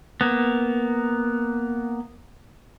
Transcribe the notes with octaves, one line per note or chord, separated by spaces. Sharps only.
A#3 B3